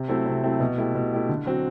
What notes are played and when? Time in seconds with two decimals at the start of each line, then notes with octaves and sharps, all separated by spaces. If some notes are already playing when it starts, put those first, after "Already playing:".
Already playing: C3
0.09 F#3 A3 C4 E4
0.26 C3
0.43 F#3 A3 C4 E4
0.60 B2
0.78 A3 E4 G4
0.95 B2
1.13 A3 E4 G4
1.29 D3
1.46 F#3 C4 F#4